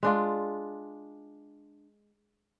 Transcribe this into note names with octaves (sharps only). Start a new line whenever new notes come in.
G#3 D4 F4